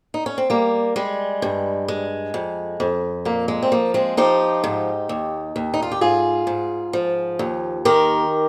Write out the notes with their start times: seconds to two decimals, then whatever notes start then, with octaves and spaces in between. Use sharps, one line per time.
0.14 D#4
0.26 C#4
0.38 C4
0.50 G3 A#3
0.96 G3 G#3
1.42 G2
1.88 G#3
2.34 F2
2.80 F2
3.25 A#2 A#3
3.48 G#3
3.63 C4
3.72 F3 A#3
3.94 G#3 C4
4.17 F3 D#4 G4
4.64 G#2
5.09 D#2
5.56 D#2
5.74 D#4
5.82 F4
5.92 G4
6.01 G#2 F4 G#4
6.47 G#2
6.93 F3
7.39 D#2
7.85 D#3 G4 A#4